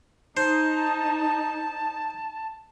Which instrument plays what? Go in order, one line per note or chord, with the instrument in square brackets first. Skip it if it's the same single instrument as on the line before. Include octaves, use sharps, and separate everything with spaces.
[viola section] D#4 [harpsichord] C5 [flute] A5